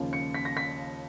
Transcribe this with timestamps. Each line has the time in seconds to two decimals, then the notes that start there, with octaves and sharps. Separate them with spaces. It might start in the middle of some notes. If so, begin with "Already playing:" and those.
Already playing: D#2 C#3 F3
0.13 C#7
0.34 B6
0.45 A#6
0.57 B6